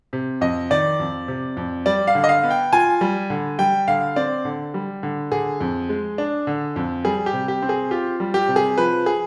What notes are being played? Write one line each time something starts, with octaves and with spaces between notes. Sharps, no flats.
C3
F2 D#5
D#3 D5
F2
C3
F2
G3 D5
F5
D3
D#5
F5
B3
G5
F4 G#5
G3
D3
G3 G5
D3 F5
C4 D5
D3
G3
D3
D3 G#4
F2
G#3
D4
D3
F2
G3 G#4
G4
C3
G4
C4
G#4
F4 G4
G3
G4
C3
G#4
F3 B4
G#4